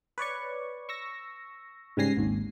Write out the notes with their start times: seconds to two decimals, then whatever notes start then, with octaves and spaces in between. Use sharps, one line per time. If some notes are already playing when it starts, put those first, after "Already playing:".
0.18 B4 C#5 D5 C#6
0.89 C#6 E6 A#6
1.97 G#2 C#3 G3 G#5 A#6 C7
2.17 G#1 D#2